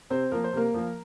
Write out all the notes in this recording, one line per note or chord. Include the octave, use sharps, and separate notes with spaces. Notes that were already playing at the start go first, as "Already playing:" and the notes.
C3 C4 C5
F3 A#3 A#4
C5
C3 A#3 A#4
F3 A#3